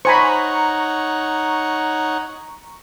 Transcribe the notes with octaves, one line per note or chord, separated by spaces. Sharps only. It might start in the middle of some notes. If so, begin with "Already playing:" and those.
D#4 C5 C#5 F#5 G#5 A#5 B5 C#6